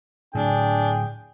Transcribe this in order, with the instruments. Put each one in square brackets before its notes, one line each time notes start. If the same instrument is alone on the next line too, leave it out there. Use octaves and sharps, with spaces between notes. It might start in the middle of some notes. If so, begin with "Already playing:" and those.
[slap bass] A2 D3 F#3 [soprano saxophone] D4 [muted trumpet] G#4 [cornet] G5